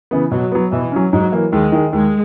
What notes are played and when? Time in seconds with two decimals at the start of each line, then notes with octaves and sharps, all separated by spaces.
0.11 C#3 E3 B3
0.31 B2 F#3
0.52 F#3 B3
0.72 B2 E3
0.92 F#3 C#4
1.12 G#2 F#3
1.32 E3 A#3
1.52 D#2 G#3
1.72 D#3 G#3
1.93 D#2 G#3